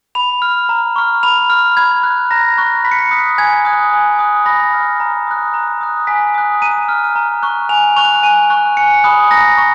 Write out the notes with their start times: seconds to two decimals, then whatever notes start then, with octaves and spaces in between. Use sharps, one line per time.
0.15 B5 F7
0.42 F6
0.69 A#5
0.96 C#6 F6
1.23 B5 F7
1.50 F6
1.77 B5 G#6
2.03 F#6
2.31 A#5 A#6
2.58 C#6 F#6
2.84 B5 B6
2.91 C#7
2.99 B6
3.11 D#6 F#6
3.38 G#5 G#6
3.65 D#6 F#6
3.92 G#5
4.19 D#6 F#6
4.46 B5 A#6
4.73 F6
5.00 A#5
5.27 D#6 F#6
5.54 A#5
5.81 D#6 F#6
6.07 G#5 B6
6.35 D#6 F#6
6.61 A#5 D#7
6.89 F6
7.16 A#5
7.43 C#6 F#6
7.69 G#5 F7
7.96 C#6 F#6 F7
8.23 G#5 D#7
8.50 C#6 F#6
8.77 G#5 C#7
9.04 B5 D#6 F#6
9.31 A#5 A#6
9.58 C#6